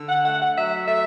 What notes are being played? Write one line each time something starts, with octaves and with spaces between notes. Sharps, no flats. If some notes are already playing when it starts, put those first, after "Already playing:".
Already playing: D3
F#5
A3 F#5
F#5
F#3 E5
A3 E5